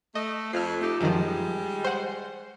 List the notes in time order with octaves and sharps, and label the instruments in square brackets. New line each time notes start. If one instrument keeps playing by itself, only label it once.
[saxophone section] A3 [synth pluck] D#5
[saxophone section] F2 [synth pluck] F6 C7
[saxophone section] A3 D#4 G4
[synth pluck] F#2 D#3 F3 [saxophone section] G3 G#3
[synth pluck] C5 F#5